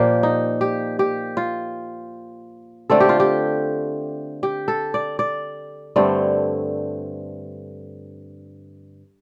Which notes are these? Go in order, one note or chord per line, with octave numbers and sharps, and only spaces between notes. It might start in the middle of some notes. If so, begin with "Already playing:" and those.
Already playing: A#2 F3 A#3 G4
D#4
G4
G4
F4
D3 A3 C4 A4
G4
F4
G4
G4
A4
D5
D5
G2 D3 A3 C4